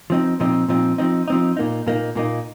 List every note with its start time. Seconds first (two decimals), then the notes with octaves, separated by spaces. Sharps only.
0.10 F3 C4 D#4
0.40 A#2 F3 C4 D#4
0.68 A#2 F3 C4 D#4
0.98 F3 C4 D#4
1.28 F3 C4 D#4
1.57 A#2 A#3 D#4
1.87 A#2 A#3 D#4
2.15 A#2 A#3 D#4